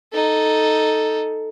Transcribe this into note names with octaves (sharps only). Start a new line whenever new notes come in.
D#4 A4